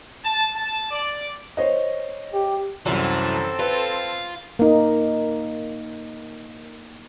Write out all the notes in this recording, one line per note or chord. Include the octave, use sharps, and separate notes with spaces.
A5
A5
D5
C5 C#5 D#5
G4
C2 F#2 E3 C4 A4
F4 B4
A#3 D#4